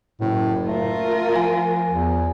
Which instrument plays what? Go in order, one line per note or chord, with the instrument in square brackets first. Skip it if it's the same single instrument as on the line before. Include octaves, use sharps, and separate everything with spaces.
[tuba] F#1 [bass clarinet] A2
[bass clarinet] A3 [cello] F4 A#4
[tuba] F3 [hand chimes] G#5
[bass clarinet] E2